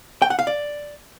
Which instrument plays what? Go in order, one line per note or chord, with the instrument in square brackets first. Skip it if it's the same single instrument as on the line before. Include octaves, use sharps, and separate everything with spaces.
[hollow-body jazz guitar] G5
F#5
F5
D5